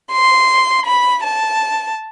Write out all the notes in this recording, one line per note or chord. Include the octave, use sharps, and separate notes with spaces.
C6
B5
A5